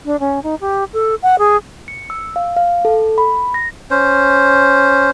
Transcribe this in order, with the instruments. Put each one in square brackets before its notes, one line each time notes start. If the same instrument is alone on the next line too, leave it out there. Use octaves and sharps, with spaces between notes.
[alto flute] D4
C#4
D#4
G4
A4
F#5
G#4
[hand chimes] C#7
E6
F5
F5
A4
B5
A#6
[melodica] C#4 C5